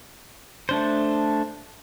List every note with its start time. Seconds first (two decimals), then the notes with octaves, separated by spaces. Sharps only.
0.69 A3 D4 C5